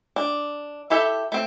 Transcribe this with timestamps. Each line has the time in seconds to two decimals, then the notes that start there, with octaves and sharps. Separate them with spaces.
0.16 D4
0.90 E4 G4 A4 E5
1.32 A3 C4